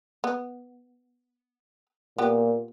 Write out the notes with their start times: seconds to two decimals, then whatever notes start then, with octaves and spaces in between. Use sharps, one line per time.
0.24 B3
2.18 A#2 B3 G4